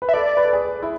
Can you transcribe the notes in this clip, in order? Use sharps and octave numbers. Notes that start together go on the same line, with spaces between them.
B4
E5
A4 D5
B4
A4
G#4
E4